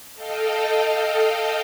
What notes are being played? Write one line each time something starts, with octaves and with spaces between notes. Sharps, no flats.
A4 D#5 F5 G5